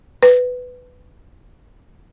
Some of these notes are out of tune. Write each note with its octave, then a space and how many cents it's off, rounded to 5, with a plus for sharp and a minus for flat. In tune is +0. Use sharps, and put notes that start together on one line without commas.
B4 +10